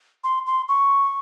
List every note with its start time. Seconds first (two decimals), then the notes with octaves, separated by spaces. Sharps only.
0.24 C6
0.47 C6
0.68 C#6